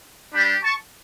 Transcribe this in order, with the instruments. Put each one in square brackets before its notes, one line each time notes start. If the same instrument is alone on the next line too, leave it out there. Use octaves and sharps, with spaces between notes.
[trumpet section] G3 D4 G4 G5 B5
A5 C#6